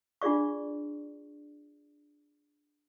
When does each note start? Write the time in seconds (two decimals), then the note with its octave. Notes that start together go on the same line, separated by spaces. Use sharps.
0.22 D4 F4 G#4 D5 C#6